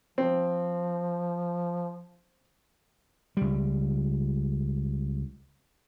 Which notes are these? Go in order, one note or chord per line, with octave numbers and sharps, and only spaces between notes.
F3 C4
C#2 G3